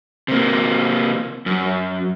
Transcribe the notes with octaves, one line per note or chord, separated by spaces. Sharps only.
C3 A#3
F#2